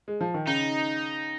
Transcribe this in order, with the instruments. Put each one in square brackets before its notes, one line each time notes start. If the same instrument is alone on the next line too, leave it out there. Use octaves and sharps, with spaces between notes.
[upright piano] G#3
F3
D#3
[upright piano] C#3 [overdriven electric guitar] D#4